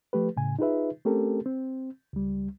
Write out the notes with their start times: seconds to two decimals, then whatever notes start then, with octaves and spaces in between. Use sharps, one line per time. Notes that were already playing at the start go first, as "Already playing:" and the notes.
0.13 F3 A3 G4 B4
0.37 A2 C#3 G#5
0.59 D#4 F4 G#4 B4 E5
1.05 A3 C4 C#4 G4 A4 A#4
1.46 C4
2.13 C#2 G3